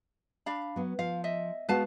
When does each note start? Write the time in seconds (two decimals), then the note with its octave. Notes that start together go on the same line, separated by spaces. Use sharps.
0.46 D4 F5 B5
0.76 F#3 B3
0.99 F3 F5
1.24 D#5 E5
1.69 G#3 B3 F#4 B4 F5 A5